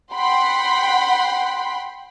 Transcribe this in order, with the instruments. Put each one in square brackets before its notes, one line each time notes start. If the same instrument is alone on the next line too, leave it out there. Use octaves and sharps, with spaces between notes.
[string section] F#5 G5 B5 C6